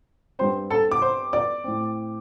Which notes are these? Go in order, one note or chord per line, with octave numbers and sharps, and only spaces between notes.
G2 G3 C4 C5 C6
A4 A5
D6
C5 C6
D5 D6
A2 A3 C4